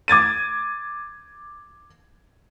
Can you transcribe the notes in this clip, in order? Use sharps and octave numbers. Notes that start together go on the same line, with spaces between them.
D6 G#6 A6 D#7